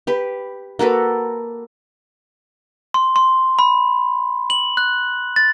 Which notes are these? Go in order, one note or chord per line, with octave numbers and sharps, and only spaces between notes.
G4 B4
A#3 F#4 A4 B4
C6
C6
B5
F#7
F#6
A6